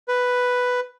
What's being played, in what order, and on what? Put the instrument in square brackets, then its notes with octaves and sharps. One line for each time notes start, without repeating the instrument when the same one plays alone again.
[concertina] B4